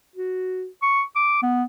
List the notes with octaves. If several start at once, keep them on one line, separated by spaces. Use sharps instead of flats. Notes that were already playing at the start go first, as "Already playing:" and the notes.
F#4
C#6
D6
B3